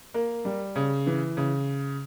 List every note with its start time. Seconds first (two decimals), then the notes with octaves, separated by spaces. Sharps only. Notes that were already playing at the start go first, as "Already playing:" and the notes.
0.14 A#3
0.45 G3
0.76 C#3
1.07 E3
1.37 C#3